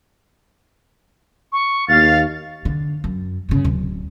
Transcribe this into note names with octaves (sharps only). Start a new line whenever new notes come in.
C#6
D#2 F5 A6
D3
F#2
G2 C#3
D1